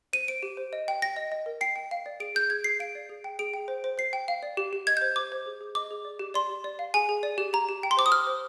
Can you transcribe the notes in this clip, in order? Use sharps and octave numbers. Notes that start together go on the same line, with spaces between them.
C5 D#7
C5 D7
G4
C5
D#5
G5
G5 A#6
D#5
D#5
A#4
G5 C7
G5
F5
D5
G#4 D7
G#4 G6
G#4 G#6
G#4 C7
F5 D7
D5
G#4
G5
G#4 D7
G5
C5
C5
C5 C7
G5
F5
D5
G4
G4
D#5 G#6
G6
C5
C5 D6
C5
G#4
G#4
D#5 D6
G#4
D5
G4
D5 C6
G4
D5
F5
G#4 G#5
G#4
D5
G4
G4 A#5
G4
G5
C6
C5 D6
D#6
C5 F6
C5